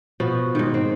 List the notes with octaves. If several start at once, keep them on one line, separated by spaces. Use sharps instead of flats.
B2 F3 F#4
G#2 D#3
C4